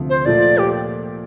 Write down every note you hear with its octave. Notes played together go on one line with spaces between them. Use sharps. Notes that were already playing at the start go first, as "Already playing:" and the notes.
Already playing: D2 C3 F3
C5
A#2 F3 A3 D5
G4